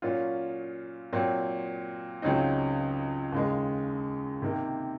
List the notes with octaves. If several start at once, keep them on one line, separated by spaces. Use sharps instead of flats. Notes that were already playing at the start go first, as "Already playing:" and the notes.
A#2 F#3 C#4 F4
A#2 F#3 C4
C#2 C#3 F#3 C4 D#4
D#2 C#3 G#3
C3 D#3 A#3